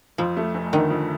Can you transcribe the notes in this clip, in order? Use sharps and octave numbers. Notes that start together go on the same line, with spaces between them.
F2 F3
A3
F1
D3 D#3
F2